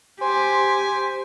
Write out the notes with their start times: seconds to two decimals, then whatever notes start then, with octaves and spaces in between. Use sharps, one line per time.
0.21 G4 C5 G#5